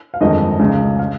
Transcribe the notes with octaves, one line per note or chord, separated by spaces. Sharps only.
F5
G1 F2 D#3 G#3 D#5
C#2 C#3 G#3
F5